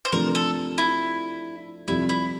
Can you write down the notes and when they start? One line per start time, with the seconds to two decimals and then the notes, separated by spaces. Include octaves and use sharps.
0.05 C5
0.12 C3 F3 A3 D4 A#4
0.35 A4
0.78 E4
1.88 F2 C3 G3 E4
2.09 E4